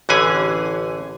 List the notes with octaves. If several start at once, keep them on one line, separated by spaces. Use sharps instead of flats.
A1 D3 E3 C#4 G#4 G#5